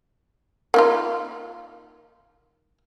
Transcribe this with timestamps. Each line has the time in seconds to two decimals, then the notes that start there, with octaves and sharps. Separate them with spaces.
0.74 A#3 D#4 F4